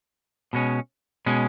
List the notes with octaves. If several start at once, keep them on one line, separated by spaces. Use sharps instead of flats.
B2 G#3 C#4
B2 G#3 C#4